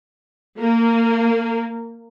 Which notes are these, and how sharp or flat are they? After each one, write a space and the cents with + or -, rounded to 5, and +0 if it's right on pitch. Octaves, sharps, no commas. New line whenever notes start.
A#3 -20